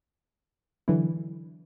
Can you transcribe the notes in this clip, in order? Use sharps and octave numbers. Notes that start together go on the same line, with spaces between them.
D3 E3 F#3 D4 E4